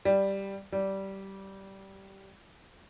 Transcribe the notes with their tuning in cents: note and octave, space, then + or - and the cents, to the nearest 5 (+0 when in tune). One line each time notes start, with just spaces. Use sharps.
G3 +0
G3 -15